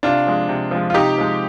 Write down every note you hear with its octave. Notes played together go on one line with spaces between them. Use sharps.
C3 D4 F4
F3 G#3
C3
F3 G#3
F4
C3 D#4 G4
F3 G#3